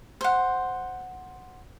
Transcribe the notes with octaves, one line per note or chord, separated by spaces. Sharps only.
C5 F#5